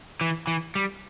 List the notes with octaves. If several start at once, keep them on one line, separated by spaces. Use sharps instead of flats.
E3
E3
G3